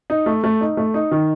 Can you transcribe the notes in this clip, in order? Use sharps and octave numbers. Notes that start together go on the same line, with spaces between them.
D#4
A3
A3
D#4
A3
D#4
D#3